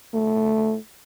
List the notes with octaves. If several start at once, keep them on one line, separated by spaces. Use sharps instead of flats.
A3